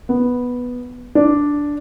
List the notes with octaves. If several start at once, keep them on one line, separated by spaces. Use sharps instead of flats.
B3
D4